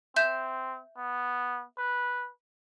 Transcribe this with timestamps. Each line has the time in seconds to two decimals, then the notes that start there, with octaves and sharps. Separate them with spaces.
0.16 C4 E5 G6 E7
0.97 B3
1.78 B4